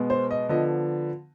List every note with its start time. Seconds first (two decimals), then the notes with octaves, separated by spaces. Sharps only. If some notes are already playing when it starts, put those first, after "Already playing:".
Already playing: B2 G#3 B3
0.10 C5
0.31 D#5
0.49 D3 F3 B3 D#5